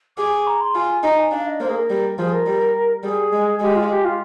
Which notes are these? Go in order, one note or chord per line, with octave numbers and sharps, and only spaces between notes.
G#4 D6
A#5
C6
F4 G#5
D#4 A#5
G#5
D4 F5
D#5
A#3 C5
G#4
A#4
G3
F3 G#4
A#4
G3
G3 G#4
G#3
G#3 G4
F4
G4
F4